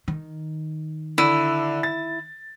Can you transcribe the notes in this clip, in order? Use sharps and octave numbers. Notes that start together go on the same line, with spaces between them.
D#3
D3 E4 D#7
A6